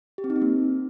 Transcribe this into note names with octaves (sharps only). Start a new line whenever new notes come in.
G4
C4
D#4
C4
A#3